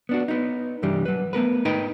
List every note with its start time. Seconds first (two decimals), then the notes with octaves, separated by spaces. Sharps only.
0.09 B3 D4 F#4
0.28 B3 D#4
0.82 C2 G2 E3 G3 D4 G4
1.05 F#3 B4
1.33 A3 B3 A#4 B4
1.65 G#2 D#4 B4 D#5 G5